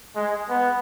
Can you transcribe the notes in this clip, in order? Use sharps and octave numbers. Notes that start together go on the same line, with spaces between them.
G#3
B3